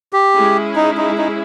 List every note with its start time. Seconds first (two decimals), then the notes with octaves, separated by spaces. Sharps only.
0.13 G4
0.34 G#3 C#4 E4 G#4
0.76 D#4
0.97 D#4
1.18 D#4